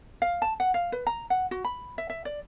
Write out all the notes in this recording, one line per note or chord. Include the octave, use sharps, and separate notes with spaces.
F5
A5
F#5
F5
B4
A#5
F#5
F#4
B5
E5
E5
D5